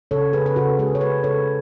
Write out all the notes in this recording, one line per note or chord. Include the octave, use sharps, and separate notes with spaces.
C#3 A4 C#5
C#3 G#4 B4
B4
C#3 F#4 A4
G#3 G#4 B4
C#5
G#3 G#4 B4
C#3 A4 C#5